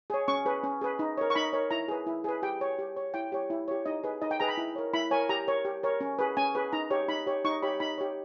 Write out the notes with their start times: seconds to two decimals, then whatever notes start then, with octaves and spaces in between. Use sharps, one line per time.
0.10 G#4 C#5
0.28 C#4 C#6
0.45 G#4 B4
0.64 C#4
0.81 G#4 B4
0.99 D#4
1.17 A#4 C#5
1.30 C#6
1.35 D#4 B5
1.53 A#4 C#5
1.71 E4 A#5
1.88 G#4 B4
2.07 E4
2.24 G#4 B4
2.42 G4 G5
2.61 C#5
2.79 G4
2.97 C#5
3.14 E4 G5
3.32 G4 C#5
3.50 E4
3.68 G4 C#5
3.86 D#4 D#5
4.04 G#4 B4
4.22 D#4 D#5
4.31 G5
4.40 G#4 B4 A#5
4.48 B5
4.57 E4
4.76 A#4 C#5
4.93 E4 B5
5.11 A#4 C#5 G#5
5.29 G4 A#5
5.47 A#4 C#5
5.65 G4
5.83 A#4 C#5
6.01 C#4
6.19 G#4 B4
6.37 C#4 G#5
6.55 G#4 B4
6.73 D#4 A#5
6.90 G4 C#5
7.08 D#4 B5
7.26 G4 C#5
7.45 D#4 C#6
7.62 G4 C#5 B5
7.80 D#4 B5
7.98 G4 C#5